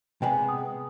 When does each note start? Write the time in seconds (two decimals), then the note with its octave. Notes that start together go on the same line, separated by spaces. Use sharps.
0.22 C3 G#3 B3 G5 G#5
0.49 D#6